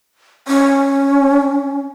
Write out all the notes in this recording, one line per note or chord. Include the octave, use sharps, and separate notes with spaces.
C#4